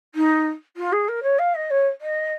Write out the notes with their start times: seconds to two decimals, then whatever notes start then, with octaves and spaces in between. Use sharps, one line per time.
0.15 D#4
0.76 F4
0.92 G#4
1.08 A#4
1.23 C#5
1.38 F5
1.54 D#5
1.70 C#5
2.01 D#5